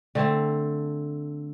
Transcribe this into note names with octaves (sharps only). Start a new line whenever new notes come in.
D3 A3 C4